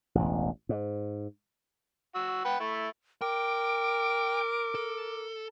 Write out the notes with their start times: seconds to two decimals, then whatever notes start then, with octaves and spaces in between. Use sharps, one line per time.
0.15 E1 A1
0.69 G#2
2.15 F#4 E6
2.45 B4 F#5 G5
2.60 A3 E4
3.21 A#4 G5 D6
4.75 A4